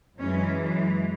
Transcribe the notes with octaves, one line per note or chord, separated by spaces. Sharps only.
F#2 E3 G#3 C#4